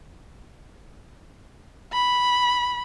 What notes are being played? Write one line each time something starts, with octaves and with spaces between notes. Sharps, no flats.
B5